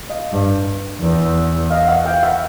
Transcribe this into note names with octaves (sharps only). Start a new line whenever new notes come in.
D#5 F5
G2
E2
D#5 F5
E5 F#5
F5 G5
E5 F#5